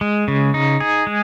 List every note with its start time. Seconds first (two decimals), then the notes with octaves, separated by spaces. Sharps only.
0.01 G#3
0.28 C#3
0.54 D#4
0.80 G#4
1.07 G#3